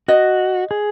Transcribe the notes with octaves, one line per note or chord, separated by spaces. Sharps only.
F#4 D#5
G#4